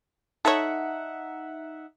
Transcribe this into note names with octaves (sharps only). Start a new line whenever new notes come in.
D#4 A4 C#5 E5 F#5